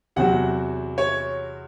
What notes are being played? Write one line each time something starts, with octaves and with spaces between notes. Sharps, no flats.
E2 C3 F#3 F#5
C#5